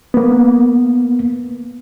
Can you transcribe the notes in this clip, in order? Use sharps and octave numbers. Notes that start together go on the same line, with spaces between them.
A#3 B3